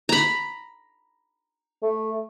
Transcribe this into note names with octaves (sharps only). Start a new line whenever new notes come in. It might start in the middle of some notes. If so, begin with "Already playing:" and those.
A#5 B5
A3